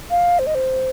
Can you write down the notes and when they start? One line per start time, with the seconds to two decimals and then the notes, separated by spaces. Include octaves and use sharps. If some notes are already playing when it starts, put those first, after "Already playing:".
0.10 F5
0.39 C5
0.47 D#5
0.55 C5